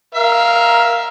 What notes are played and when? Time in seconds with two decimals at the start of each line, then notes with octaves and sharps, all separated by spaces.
0.15 A#4 E5 F5